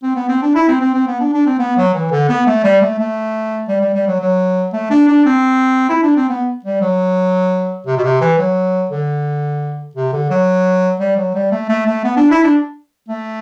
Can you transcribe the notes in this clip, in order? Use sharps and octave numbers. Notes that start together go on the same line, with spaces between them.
C4
B3
C4
D4
E4
C4
C4
C4
B3
D4
D4
C4
B3
F#3
E3
D3
B3
A3
G3
A3
A3
G3
G3
G3
F#3
F#3
A3
D4
D4
C4
E4
D4
C4
B3
G3
F#3
C3
B2
C3
E3
F#3
D3
C3
D3
F#3
G3
F#3
G3
A3
A3
A3
B3
D4
E4
D4
A3